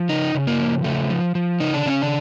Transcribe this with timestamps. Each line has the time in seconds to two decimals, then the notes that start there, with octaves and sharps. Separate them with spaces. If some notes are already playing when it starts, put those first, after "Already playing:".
Already playing: F3
0.09 C#3 D#4
0.35 C#3
0.47 A#3
0.59 F3
0.84 C#3 A3
1.10 F3
1.35 F3
1.60 C#3 D#4
1.74 D4
1.86 C#3 C#4
2.02 D4